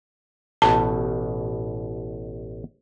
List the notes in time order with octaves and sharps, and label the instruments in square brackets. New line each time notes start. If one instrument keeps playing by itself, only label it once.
[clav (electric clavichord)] A1 B2 [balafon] A5